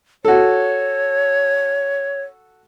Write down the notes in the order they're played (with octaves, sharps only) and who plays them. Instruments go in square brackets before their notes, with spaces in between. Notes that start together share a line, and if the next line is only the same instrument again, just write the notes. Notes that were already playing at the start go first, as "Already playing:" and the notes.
[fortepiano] F#4 A4 [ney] C#5